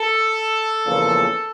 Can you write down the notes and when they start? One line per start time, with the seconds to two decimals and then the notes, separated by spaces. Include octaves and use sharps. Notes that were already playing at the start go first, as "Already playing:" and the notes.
Already playing: A4
0.85 E2 C#3 F3 A#3